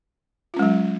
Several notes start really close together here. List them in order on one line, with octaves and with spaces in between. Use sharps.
F4 C#4 G#3 F#3